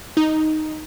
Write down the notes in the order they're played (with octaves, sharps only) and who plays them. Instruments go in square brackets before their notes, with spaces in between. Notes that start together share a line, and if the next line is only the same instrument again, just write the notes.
[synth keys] D#4